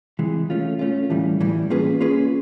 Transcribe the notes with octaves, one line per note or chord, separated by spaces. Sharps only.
C3 E3 G#3
A3 C#4 F4
A3 C#4 F4
A2 E3 G3
A2 E3 G3
A#3 C#4 F4 G#4 B4
A#3 C#4 F4 G#4 B4